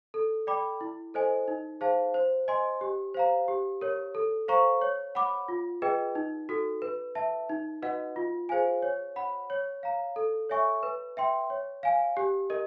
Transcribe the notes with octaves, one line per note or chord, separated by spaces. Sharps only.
A4
D5 G5 B5 D6
E4
A4 C5 D#5 G#5
D#4
G#4 C5 F5 A5
C5
D#5 G#5 C6
G4
C5 F5 A#5
G4
A#4 C#5
A4
C5 F5 A#5 C#6
C#5
F#5 B5 D6
F4
G#4 B4 D#5 G5
D#4
F#4 A4
B4
E5 A5
D#4
F#4 B4 D#5 F#5
F4
G#4 C5 F5 G#5
C#5
F#5 B5
C#5
F5 A#5
A4
C#5 E5 G#5 C#6
B4
E5 G5 C6
C#5
F5 G#5
G4
A#4 D#5